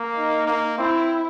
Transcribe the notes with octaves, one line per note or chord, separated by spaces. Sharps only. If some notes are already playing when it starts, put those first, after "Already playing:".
Already playing: A#3
D#4
A#3
C4 E4